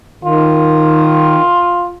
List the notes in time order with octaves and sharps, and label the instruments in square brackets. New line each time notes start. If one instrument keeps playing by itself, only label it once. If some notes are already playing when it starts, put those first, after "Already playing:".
[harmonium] D#3 [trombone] F4